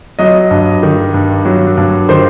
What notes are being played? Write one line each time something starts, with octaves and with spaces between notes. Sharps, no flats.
F#3 D#5
G2
D#3
G2
F#3
G2
D#3 C5